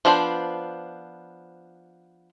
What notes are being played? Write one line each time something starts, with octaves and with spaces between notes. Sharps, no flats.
F3 B3 D4 G#4 C5